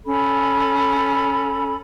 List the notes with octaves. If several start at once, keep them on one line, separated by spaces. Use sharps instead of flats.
C#4 A4 B5